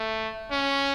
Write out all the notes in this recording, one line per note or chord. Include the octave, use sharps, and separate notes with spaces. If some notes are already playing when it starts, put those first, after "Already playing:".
Already playing: A3
C#4